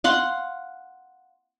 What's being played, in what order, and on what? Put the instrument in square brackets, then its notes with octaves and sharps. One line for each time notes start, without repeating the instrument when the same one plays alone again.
[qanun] F5 F#5 C6